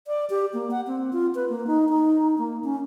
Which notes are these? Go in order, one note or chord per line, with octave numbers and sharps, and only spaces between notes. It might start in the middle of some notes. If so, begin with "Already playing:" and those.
D5
G4
A#3
F#5
C4
F4
B4
A#3
D#4
D#4
A#3
C#4